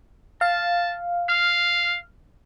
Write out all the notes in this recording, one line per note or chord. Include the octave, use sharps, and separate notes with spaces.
F5 A5
F5 F6